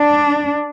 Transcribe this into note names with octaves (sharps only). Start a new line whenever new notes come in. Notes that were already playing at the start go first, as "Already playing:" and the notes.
Already playing: D4